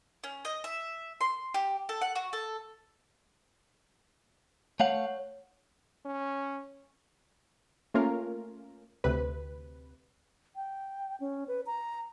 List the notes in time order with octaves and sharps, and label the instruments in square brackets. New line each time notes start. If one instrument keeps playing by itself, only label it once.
[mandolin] C#4
D#5
E5
C6
G4
A4
F#5
F#4
A4
[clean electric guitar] A3 F5 F#5 [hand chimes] C#5
[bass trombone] C#4
[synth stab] A3 A#3 C#4 F4 A#4
D2 C3 B4
[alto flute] G5
C#4
B4
A#5